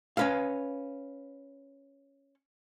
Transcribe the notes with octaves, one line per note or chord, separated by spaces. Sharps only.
C#4 B4 F5